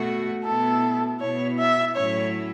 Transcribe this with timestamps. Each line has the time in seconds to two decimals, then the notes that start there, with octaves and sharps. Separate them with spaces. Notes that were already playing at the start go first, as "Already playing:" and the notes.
Already playing: B2 A3 F#4
0.44 B2 B3 E4 A4
1.20 B2 B3 E4 C#5
1.58 E5
1.95 A2 F#3 C#4 E4 C#5